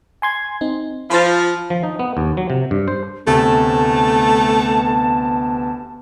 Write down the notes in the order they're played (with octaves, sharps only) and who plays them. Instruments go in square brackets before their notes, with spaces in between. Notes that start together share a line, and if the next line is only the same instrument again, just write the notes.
[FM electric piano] G#5 C6 G#6
C4 D#4
[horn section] F3 [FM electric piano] B5 C6 A6
[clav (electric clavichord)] F3
D#4
B3
D#2
F#3
C3
G2
C5
[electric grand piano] D2 C3 [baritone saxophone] A3 [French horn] B3 [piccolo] A5